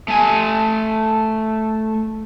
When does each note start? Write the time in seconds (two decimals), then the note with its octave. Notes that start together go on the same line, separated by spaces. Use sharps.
0.08 A3 G#5